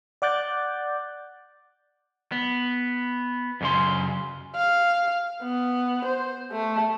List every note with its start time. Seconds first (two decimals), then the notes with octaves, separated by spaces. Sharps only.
0.22 D5 F#5 D6 F#6 G6 A6
2.32 B3
3.61 F#2 C#3 C6
4.56 F5
5.43 B3
6.05 C5
6.52 A3